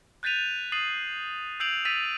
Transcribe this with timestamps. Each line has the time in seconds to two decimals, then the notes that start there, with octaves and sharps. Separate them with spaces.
0.23 F#6 G6 A6 B6 D#7 F7
0.72 D#6 A6 C7 D#7 F#7
1.60 E6 G6 C7 D7 F7 F#7
1.85 E6 A6 B6 D#7 F7